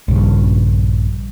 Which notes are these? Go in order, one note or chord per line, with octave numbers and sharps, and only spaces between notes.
A#1 G2 C#3